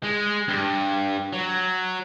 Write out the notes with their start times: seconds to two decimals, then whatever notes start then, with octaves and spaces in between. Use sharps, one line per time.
0.03 G#3
0.48 G2
1.33 F#3